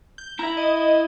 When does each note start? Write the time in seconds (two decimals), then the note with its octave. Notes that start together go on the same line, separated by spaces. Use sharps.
0.18 G6
0.39 E4 E5 A#5
0.57 D#5